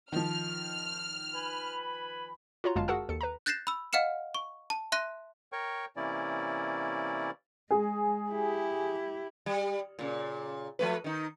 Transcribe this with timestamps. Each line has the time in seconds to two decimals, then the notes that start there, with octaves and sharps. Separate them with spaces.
0.12 D#3 F3 F6
1.33 B4 G#5 B5
2.64 F4 F#4 C#5 A#5 C6
2.76 G1 F#2 G#3 F4 F5 A5
2.88 F#4 G#4 A#4 F#5 A5 E6
3.09 D#2 A4 C#7
3.21 B4 A#5
3.46 F#6 G6 A6 A#6 C7 E7
3.67 B5 E6
3.93 D#5 F5 F#5 F6 C#7 E7
4.35 C#6
4.70 A5
4.92 E5 C6 F#6 A#6 D#7
5.52 A#4 C#5 G5 C#6
5.96 C3 E3 A#3 C#4 E4 D5
7.71 G#3 G#4
8.29 E4 G4
9.46 G3
9.99 A#2 C#3
10.79 F3 A3 B4
11.04 D#3 D#4